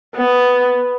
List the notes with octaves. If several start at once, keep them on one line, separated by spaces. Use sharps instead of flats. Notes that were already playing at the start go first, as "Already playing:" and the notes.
B3